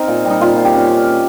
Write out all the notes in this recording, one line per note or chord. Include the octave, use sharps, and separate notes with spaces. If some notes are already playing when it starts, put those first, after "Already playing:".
Already playing: C4 D#4 A#4
A#2
G3
D#4
A#2 F4
A#2
G4
C#4